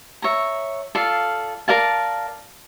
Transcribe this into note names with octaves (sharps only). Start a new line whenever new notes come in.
C#5 E5 A#5
F4 A4 D5 F5
A#4 D5 F5 A5